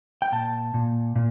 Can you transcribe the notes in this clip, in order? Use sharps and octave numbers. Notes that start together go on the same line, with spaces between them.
G5
A#2 A5
A#2
A#2